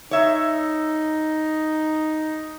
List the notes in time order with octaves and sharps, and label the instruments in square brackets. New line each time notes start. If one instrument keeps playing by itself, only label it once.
[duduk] D#4 [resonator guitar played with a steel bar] C#5 E5